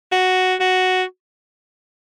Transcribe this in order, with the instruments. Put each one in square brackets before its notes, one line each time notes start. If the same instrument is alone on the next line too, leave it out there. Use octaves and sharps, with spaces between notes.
[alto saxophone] F#4
F#4